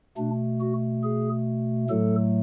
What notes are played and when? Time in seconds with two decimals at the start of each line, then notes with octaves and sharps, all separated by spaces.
0.17 B2 A3 D4
0.60 F#4
1.03 G#4
1.89 A2 F#3 A3 A4